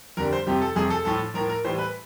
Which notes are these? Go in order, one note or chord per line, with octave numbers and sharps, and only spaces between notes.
F2 D3 G3 A#4
C5
F2 C3 F3 G4
A4
F2 C3 F3 G#4
A4
A2 F3 A4
A2 F3 A#4
A#4
A2 E3 G3 C5
B4